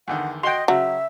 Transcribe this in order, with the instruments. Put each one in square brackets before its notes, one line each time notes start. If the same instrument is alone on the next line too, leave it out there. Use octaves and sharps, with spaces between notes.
[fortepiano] E2 D3 D#3 [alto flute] F#5
[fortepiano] F#4 F#5 [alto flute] D#5 [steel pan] G5 C6
[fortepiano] C#3 [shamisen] F#3 [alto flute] E5